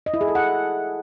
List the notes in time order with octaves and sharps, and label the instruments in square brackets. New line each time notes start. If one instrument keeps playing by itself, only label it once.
[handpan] D#5
E4
G#4
A4
F#5